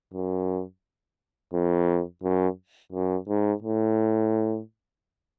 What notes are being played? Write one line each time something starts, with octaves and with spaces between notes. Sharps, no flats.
F#2
F2
F#2
F#2
G#2
A2